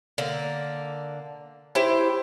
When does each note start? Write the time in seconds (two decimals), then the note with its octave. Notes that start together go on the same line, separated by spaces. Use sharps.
0.18 D3 A#3
1.75 E4 G4 C5 G5